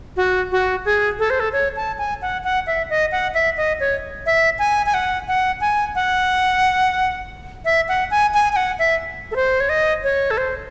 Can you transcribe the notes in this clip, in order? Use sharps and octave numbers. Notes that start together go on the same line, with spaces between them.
F#4
F#4
G#4
A4
C5
A4
C#5
A5
G#5
F#5
F#5
E5
D#5
F#5
E5
D#5
C#5
E5
G#5
G#5
F#5
F#5
G#5
F#5
E5
F#5
G#5
G#5
G#5
F#5
E5
A4
C5
C#5
D#5
C#5
A4
C5